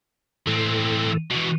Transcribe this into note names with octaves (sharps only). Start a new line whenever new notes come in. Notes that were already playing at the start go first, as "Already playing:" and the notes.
A2 E3 C4 A4
B2 E3 F#4